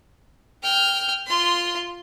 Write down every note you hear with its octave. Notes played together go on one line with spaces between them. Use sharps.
G5 F6
F4 C6